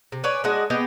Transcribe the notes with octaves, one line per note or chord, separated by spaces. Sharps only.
C3
B4 C#5 D5 G#5
G#3 D4 F#4 D#5
B3 G4 G#4 D#5